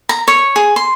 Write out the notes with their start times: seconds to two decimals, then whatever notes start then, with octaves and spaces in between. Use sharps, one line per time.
0.09 A#5
0.28 C#5
0.56 G#4
0.76 C6